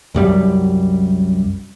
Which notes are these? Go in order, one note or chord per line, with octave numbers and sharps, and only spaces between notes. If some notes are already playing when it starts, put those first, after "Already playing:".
C2 F#2 G3